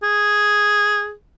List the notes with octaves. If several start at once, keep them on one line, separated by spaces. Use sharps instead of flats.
G#4